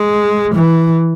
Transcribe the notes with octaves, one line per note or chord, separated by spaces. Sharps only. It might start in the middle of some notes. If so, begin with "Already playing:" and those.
Already playing: G#3
E3